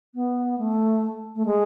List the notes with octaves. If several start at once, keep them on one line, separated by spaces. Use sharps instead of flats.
B3
A3
A3
G#3